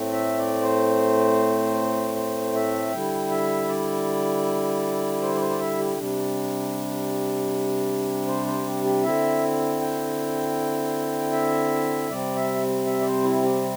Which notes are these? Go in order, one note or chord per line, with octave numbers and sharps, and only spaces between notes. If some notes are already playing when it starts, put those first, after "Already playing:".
Already playing: A2 A3 C4
E5
D5
C5
C5
E5
D3 G3 E4 G5
E5
D5
C5
D5
C5
D5
E5
G4
C3 G3 D4
C5
C5
G4
G4
D3 C4 E4 E5
G5
E5
C3 G3 C4 D5
E5
E5
D5
C5
E4
G4